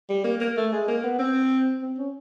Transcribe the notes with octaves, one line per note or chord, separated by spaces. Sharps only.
G3
A#3
A#3
A3
G#3
A#3
B3
C4
C4
C#4